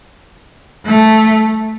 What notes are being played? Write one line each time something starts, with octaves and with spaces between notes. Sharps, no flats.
A3